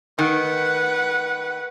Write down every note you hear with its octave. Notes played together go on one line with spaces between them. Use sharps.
D#3 B4 F#5